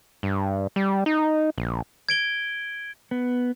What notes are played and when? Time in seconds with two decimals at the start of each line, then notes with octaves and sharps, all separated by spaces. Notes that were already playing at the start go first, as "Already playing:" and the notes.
0.23 G2
0.76 G3
1.06 D#4
1.58 A#1
2.09 G#6 D7 G7
3.11 B3